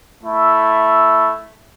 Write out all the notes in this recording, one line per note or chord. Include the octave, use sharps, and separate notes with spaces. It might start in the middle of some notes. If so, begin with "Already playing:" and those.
A3 E4 E5